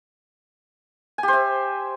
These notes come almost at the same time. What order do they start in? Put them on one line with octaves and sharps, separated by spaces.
G#5 G4 C5 E5